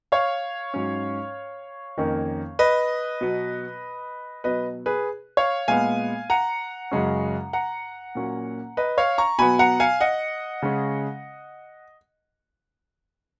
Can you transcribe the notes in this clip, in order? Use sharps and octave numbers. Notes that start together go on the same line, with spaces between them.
C#5 F5
G#2 F#3 C#4
F2 D#3 A#3 C#4
B4 D#5
B2 F#3 B3
B2 F#3 B3 B4 D#5
G#4 B4
C#5 F5
A#2 G#3 B3 F5 G#5
F#5 A#5
F#2 C#3 G#3 C#4
F#5 A#5
A#2 F#3 A#3 C#4
B4 D#5
C#5 F5
A#5 C#6
B2 F#3 B3 G#5 B5
F#5 A#5
F5 G#5
D#5 F#5
C#3 G#3 C#4